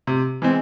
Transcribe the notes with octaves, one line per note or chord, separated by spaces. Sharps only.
C3
E3 G#3 C4